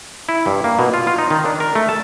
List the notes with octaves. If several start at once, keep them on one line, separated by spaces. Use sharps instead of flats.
E4
G2
A#3
B2
F4
F4
D#4
D#3
D4
A#4
A3
A5